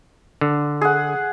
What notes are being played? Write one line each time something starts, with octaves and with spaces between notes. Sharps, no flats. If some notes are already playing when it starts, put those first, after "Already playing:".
D3
G#4 F#5